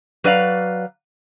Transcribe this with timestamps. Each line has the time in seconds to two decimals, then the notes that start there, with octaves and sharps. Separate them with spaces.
0.24 F#3 B4 D5 F5